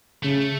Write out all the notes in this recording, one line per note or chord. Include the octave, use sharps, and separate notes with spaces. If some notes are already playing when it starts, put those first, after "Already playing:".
C#3 A3